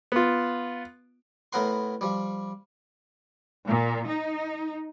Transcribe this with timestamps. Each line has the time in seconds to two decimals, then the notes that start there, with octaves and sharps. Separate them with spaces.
0.12 B3 F4
1.53 A2 B3 A#4 F#5 C6
2.01 F3 G3
3.69 A#2
4.06 D#4